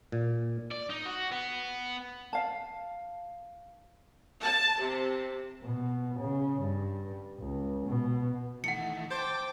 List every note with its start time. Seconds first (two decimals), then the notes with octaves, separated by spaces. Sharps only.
0.12 A#2
0.71 D5
0.90 D#4
1.05 F#4
1.32 B3
2.33 F5 A5
4.42 A5
4.79 C3
5.63 B2
6.19 C#3
6.62 G2
7.38 C#2
7.87 B2
8.64 D#3 E3 A3 F#5 C#7
9.10 C5 G5 A5 D6